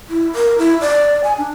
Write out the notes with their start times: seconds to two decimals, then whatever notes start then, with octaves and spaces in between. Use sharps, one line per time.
0.09 E4
0.35 A#4
0.58 E4
0.81 D5
1.24 G#5
1.38 D4